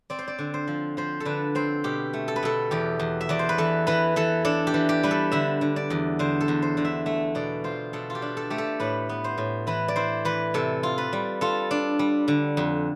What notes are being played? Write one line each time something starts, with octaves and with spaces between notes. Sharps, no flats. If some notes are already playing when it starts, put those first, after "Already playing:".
C4 D5
C5
D5
D3
C5
F3
F3 C5
A4
D3 B4
C4 C5
B2 G4
A3
A4
B4
B2 A4
E2 G4
E2
E5
E2 D5
C5
B4
E3 A4
E3 B4
E3 A4
D4 A4
G4
E3
G4
G3 B4
A4
D3 E5
D3
D5
E2
D3 C5
A4
E2
C5
D3
E5
A3 E5
B2 D5
F4 C5
B2 A4
F4
G4
D4
A4
A3 G4
A4
A2 B4
B3
C5
A2
E3 B4
D5
E4 C5
E3 B4
C3 A4
F4
B4
G3
F4 A4
D4
G3
D3
F2